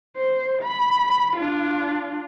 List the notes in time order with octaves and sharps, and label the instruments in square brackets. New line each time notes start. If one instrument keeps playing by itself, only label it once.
[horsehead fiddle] C5
B5
D4 F4